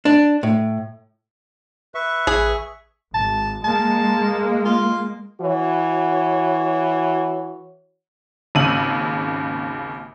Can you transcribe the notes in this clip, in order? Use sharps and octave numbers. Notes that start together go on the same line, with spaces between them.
D4
A2
B4 E5 C#6
A1 G#4
G#1 A5
G#3 A#3 A5
F4
E3 F#4 C#5
G#1 D#2 C#3 E6 D#7 F#7